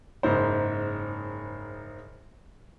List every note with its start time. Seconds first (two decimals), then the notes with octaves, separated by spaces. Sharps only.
0.23 F#1 G#2 C5